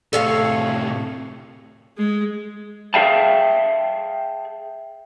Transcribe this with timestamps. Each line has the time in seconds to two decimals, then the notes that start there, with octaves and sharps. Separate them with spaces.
0.13 A2 C3 A4 C#5 F5
1.98 G#3
2.94 G#4 E5 F5 G5 A5